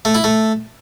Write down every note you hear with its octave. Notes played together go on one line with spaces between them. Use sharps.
A3
E4
A3